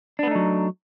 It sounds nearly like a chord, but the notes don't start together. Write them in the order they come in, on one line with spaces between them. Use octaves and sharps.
D4 B3 A3 D#4 F#3